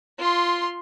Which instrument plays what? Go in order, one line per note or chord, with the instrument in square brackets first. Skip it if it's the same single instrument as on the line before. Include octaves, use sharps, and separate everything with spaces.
[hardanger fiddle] F4 C6